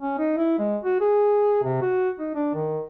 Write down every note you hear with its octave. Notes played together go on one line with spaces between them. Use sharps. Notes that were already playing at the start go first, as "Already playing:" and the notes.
C#4
D#4
E4
G#3
F#4
G#4
C3
F#4
D#4
D4
D#3